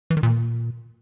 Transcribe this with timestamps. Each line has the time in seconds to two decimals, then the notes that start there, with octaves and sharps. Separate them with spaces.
0.10 E3
0.17 D#3
0.23 A#2